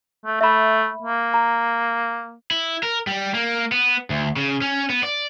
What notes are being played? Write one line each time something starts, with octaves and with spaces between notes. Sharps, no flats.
A3
A3 E5 B5
A#3
A#5
E4
A#4
G3
A#3
B3
D2
C#3
C#4
B3
D5